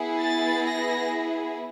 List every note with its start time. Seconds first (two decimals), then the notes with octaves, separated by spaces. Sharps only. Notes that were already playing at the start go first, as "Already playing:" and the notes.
Already playing: B3 E4 G#4
0.20 A6
0.67 A#6